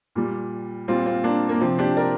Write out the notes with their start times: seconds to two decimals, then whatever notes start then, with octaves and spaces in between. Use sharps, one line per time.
0.15 A#2 G3
0.88 A#2 G3 C4 F4
1.06 C4 F4
1.24 A#3 D4
1.49 A#3
1.61 C3 F3 C4
1.79 D4 G4
1.97 A#4 D5